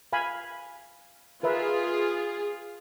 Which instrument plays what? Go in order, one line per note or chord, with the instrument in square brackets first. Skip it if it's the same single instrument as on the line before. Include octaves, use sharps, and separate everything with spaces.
[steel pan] F5 G#5 B5
[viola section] F4 G#4 [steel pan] A#4 B4 E5